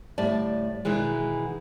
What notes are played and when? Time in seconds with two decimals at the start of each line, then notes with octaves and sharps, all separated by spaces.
0.18 D2 A2 G3 D5 A5
0.85 B2 D#3 E3 G#3